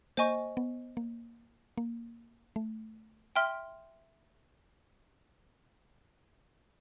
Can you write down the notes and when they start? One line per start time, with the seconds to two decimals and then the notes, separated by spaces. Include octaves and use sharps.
0.17 A#3 C5 D#5 G#5 C#6
0.57 B3
0.97 A#3
1.78 A#3
2.56 A3
3.36 E5 G5 C6 F6